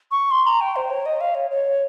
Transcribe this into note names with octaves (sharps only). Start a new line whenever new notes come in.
C#6
C6
A#5
G5
C5
C#5
D#5
F5
C#5
C#5